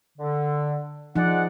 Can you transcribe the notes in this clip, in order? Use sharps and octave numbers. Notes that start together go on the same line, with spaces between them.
D3
F3 G#3 D#4 D5 F#5